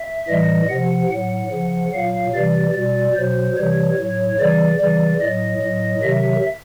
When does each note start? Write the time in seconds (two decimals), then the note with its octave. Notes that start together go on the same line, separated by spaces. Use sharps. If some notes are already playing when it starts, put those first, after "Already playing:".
Already playing: E5
0.28 A2 E3 G3 D#5
0.69 C3 F3 F#5
1.10 A2 F#3 F#5
1.52 C#3 F3
1.93 A#2 F#3 F5
2.34 C3 E3 G3 D5
2.74 B2 G3 D5
3.15 B2 F#3 C5
3.57 C3 E3 G3 C#5
3.99 A2 F#3
4.39 C#3 E3 G3 D5
4.80 C#3 E3 G3
5.21 A2 F#3 D#5
5.62 A2 F#3
6.03 C3 D#3 F#3 E5